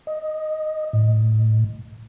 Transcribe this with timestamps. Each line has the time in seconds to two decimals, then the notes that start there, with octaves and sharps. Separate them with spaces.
0.07 D#5
0.93 A2